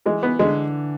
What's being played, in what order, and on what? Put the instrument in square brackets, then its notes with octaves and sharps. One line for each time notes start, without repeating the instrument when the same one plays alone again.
[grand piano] E3 [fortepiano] G#3
[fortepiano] B3
[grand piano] D3 [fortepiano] G#3